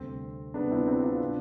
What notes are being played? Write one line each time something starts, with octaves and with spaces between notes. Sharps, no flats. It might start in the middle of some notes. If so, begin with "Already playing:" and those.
Already playing: D2 C3 G3 C4
D2 C3 G3 B3 D4
C4 E4
C4 E4
D4 F4
C3